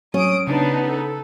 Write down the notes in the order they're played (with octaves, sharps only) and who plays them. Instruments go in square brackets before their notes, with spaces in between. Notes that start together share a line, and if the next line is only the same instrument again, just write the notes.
[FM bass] F#3 [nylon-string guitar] C#4 [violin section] D#6 D7
[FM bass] C#3 [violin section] B3 D#4 [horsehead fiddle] D4 A5
[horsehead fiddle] A4